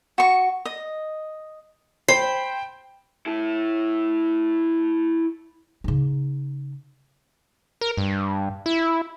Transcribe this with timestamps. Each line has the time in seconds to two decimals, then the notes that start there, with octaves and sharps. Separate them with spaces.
0.18 F#4 C#6
0.65 D#5
2.09 C5 G5 B5 C7
3.26 E4 A4
5.84 C#3 D#4
7.81 A#4
7.97 G2
8.66 E4